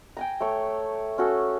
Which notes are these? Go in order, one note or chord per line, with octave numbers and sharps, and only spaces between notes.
G5 G#5 A#5
A3 C#5
C#4 F#4 A4